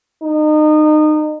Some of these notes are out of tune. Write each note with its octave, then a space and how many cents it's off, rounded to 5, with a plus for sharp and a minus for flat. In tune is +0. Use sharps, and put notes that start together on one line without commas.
D#4 -30